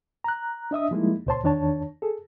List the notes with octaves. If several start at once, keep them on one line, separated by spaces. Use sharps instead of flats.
A#5 F#6
D4 D#5 E5 D#6
F3 G3 G#3 A#3 D#4 E4
C#2 A#2 C5 C#5 A5 C6
E2 D#3 D4 C#5 A5
G#4 A4